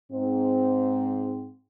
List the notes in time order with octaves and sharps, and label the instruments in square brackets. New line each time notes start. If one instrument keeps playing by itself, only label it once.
[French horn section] G#2 C4